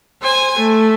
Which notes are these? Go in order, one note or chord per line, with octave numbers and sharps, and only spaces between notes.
C5 G#5
A3